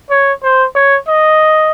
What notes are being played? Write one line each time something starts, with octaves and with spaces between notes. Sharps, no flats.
C#5
C5
C#5
D#5